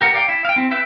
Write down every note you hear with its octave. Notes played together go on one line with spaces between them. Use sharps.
G4 A#4 F#5
D5 F5 G5
E4
F5 G5
C4 E4
E4 B4 E5 G5